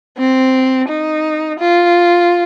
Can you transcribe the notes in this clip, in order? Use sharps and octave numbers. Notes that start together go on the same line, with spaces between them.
C4
D#4
F4